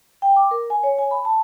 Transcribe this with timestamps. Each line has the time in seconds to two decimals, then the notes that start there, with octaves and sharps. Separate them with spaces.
0.22 G5
0.36 D6
0.51 A#4
0.70 G#5
0.83 C#5
0.98 G#5
1.11 B5
1.25 A5